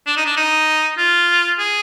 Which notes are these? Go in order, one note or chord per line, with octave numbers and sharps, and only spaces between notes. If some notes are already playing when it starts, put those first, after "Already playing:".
D4
D#4
D4
D#4
F4
G#4